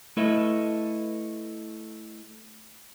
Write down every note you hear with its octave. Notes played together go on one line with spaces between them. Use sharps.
A3 E4 A4 B4 D#5 E5